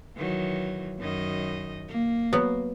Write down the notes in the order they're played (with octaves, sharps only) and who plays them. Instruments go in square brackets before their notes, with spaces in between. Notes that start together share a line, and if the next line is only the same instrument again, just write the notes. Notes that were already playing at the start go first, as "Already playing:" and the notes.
[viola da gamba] D#3 E3 F#3
F#2 D#3 D#5
A#3
[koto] F#3 B3